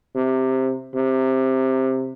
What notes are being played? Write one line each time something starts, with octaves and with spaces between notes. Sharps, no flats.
C3
C3